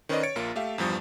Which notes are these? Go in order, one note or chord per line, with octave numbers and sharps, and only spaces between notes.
D#3 C#4 B4 C5 D5 D#5
C#5 A6 C#7 D7
A#1 A#3 F4 D7
A3 G4 E5 F5
E2 G2 F3 G3 D#6